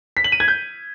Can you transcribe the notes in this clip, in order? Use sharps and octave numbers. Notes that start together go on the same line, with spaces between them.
B6
F#7
D#7
G#6
G6